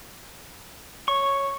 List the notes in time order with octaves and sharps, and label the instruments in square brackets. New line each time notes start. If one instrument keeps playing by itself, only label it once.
[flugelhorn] C#5 [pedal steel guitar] C#6